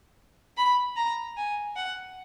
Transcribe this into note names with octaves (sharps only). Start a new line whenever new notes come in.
B5
A#5
G#5
F#5